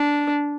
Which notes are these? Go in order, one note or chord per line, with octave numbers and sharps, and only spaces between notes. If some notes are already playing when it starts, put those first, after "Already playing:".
Already playing: D4